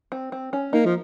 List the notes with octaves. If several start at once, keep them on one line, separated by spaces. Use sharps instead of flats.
C4
C4
C#4
A#3 D#4
F3